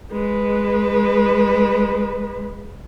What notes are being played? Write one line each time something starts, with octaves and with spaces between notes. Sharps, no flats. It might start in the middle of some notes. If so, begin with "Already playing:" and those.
G#3 B4